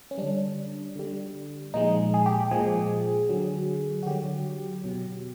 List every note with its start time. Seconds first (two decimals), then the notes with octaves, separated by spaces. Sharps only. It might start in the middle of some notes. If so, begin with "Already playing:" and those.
0.11 C#4
0.18 D3 G3 D4
0.96 D3 G3
1.74 A#2 F3 G#3 D#4
2.14 G#4
2.26 G4
2.51 A#2 F3 G#3 G#4
3.29 D3 F#3
4.03 F#4
4.06 D3 F#3 G4
4.84 B2 F#3